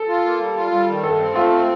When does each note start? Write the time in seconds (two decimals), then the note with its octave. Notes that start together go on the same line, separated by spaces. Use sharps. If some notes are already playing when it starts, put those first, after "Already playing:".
Already playing: A4
0.08 F4
0.24 A#3
0.41 G3
0.56 F4
0.72 G3
0.88 D#3
1.04 G2 A4
1.19 C4
1.36 A3 F4
1.51 C4